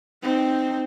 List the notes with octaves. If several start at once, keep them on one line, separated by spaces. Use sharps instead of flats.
C4 D#4